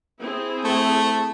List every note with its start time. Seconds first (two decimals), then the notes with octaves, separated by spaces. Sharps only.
0.19 C4 E4 G#4
0.64 A3